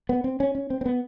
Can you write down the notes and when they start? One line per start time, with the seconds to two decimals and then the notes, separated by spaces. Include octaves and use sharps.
0.09 B3
0.24 C4
0.40 C#4
0.55 C#4
0.70 C4
0.81 C4
0.86 B3